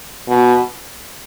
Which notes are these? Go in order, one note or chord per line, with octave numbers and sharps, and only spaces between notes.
B2